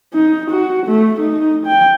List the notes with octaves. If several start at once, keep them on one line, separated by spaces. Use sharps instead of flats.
D#4
F#4
A3
D#4
G5